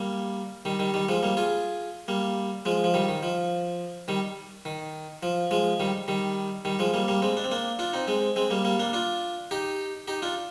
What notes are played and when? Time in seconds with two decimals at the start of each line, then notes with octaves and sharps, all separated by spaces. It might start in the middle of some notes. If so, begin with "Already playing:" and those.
Already playing: G3 A#3
0.65 D#3 G3
0.79 D#3 G3
0.94 D#3 G3
1.09 F3 G#3
1.23 G3 A#3
1.37 F4 G#4
2.08 G3 A#3
2.65 F3 G#3
2.84 F3
2.94 D#3 G3
3.08 D#3
3.23 F3
4.08 D#3 G3
4.65 D#3
5.23 F3
5.51 F3 G#3
5.80 D#3 G3
6.08 D#3 G3
6.65 D#3 G3
6.79 F3 G#3
6.94 G3 A#3
7.08 G3 A#3
7.22 G#3 C4
7.37 D4
7.44 C4
7.51 A#3 D4
7.79 D4 F4
7.93 C4 D#4
8.07 G#3 C4
8.36 G#3 C4
8.50 G3 A#3
8.65 G3 A#3
8.79 A#3 D4
8.93 D4 F4
9.51 D#4 G4
10.08 D#4 G4
10.22 D4 F4